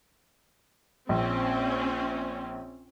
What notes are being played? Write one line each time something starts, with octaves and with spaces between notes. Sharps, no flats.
A#1 C4 C#4